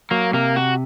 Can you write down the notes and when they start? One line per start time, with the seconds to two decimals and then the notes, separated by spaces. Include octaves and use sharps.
0.11 F#3 A#3
0.33 C3 A#3
0.56 F#4